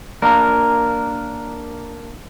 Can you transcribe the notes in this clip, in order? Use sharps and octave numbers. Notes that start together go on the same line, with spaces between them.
A#3 D4 A#4